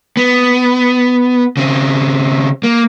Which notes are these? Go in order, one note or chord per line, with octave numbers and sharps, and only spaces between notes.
B3
C#3 C4
A#3